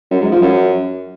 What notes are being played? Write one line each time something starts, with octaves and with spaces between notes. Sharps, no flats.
F#2
G#2
F3
F#2